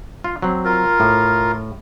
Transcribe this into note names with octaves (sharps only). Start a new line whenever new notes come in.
F4
F#3 C4
F4 A#4
A2